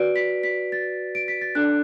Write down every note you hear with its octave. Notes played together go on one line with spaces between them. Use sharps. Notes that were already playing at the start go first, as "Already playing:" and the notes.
Already playing: F#4 B4 D5 D7
B6
B6
A6
D7
B6
A6
D4 A4 D5 F#6